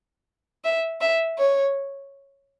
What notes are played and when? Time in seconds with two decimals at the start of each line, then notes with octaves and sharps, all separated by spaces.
0.64 E5
1.01 E5
1.38 C#5